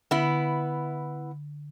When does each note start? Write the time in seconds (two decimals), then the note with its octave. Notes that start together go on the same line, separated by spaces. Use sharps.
0.11 D3 B3 E4